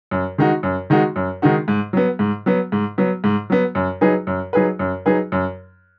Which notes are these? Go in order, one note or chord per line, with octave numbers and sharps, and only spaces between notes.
F#2
D#3 G#3 D#4 F#4
F#2
D#3 G#3 D#4 F#4
F#2
D#3 G#3 D#4 F#4
G#2
F#3 B3
G#2
F#3 B3
G#2
F#3 B3
G#2
F#3 B3
F#2
F#3 D#4 G#4 B4
F#2
F#3 D#4 G#4 B4
F#2
F#3 D#4 G#4 B4
F#2